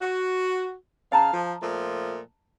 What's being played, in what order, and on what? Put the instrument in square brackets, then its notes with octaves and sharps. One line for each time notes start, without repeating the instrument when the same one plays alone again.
[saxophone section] F#4
[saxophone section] C#3 F5 [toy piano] D#5 A5 A#5
[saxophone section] F3
A#2 F3 A3